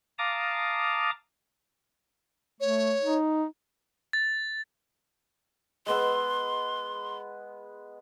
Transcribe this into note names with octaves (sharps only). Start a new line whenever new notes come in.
F5 A5 A#5 D6 D#6
A3 C#5
D#4
A6
G#3 B3 C6 E6